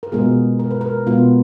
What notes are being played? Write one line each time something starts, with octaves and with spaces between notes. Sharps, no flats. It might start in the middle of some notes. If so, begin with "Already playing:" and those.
A#4
B2 G#3 B3 F4 G#4
A#4
B4
A#4
B2 G#3 B3 F4